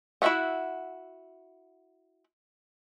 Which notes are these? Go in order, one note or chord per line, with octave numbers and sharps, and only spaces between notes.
E4 F#4 D5 E5 F#5